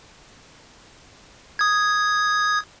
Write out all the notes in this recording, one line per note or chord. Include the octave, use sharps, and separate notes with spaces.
D#6 G#6